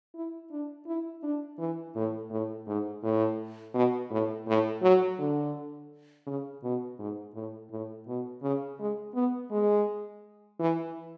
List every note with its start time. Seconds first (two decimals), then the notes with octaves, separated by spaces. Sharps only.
0.15 E4
0.51 D4
0.87 E4
1.23 D4
1.59 E3
1.95 A2
2.31 A2
2.67 G#2
3.03 A2
3.74 B2
4.11 A2
4.47 A2
4.82 F#3
5.19 D3
6.27 C#3
6.63 B2
6.99 G#2
7.35 A2
7.71 A2
8.07 B2
8.42 C#3
8.79 G#3
9.15 B3
9.51 G#3
10.59 E3